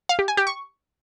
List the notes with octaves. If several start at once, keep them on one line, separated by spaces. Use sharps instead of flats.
F5
G4
G#5
G4
C#6